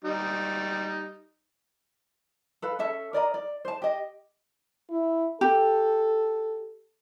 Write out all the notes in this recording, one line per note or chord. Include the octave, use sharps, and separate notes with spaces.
G3 D#4
A4 B4 F5
C#4 A4 E5 A5
A#4 D5 D#5 A#5
D5
C5 A5
G4 D#5
E4
G4 A4